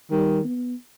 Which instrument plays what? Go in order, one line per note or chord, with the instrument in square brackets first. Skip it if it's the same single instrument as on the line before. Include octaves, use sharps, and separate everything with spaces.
[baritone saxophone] D#3 [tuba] G3
[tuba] B3